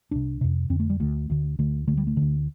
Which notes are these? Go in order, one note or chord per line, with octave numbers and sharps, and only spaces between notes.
C2 C3 D4
F2 C3
F2 D3 C4
A3
G3
D2 D3 A3
D2 D3
D2 D3 A3
D2 D3 A3
G3
A3
D2 D3